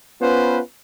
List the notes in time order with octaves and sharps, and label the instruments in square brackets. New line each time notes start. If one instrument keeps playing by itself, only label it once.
[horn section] B3 C#4 F4 B4 C5